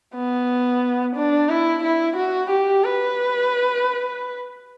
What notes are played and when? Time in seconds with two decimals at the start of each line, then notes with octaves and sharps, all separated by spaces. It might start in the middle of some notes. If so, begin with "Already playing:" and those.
0.15 B3
1.16 D4
1.50 E4
1.83 E4
2.16 F#4
2.50 G4
2.84 B4